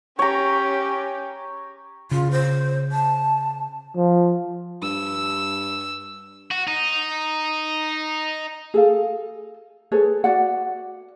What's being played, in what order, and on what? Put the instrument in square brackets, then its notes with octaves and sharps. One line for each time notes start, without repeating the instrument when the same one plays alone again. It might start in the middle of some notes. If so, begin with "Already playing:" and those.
[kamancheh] C#4 G4 [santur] C#5 A#5
[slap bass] C#3 [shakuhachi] F4
[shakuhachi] C5
A5
[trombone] F3
[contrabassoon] G2 [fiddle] E6
[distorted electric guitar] F#4
D#4
[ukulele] G#4 A4 F5
G#4 A4 B4 C#5
F#4 D5 F#5